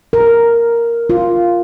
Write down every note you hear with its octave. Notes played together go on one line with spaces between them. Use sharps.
A#4
F4